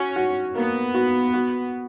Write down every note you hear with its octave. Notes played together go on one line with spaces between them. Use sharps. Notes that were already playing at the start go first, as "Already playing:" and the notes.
Already playing: C#4 F#4
F#4
A#3 B3
F#4
F#4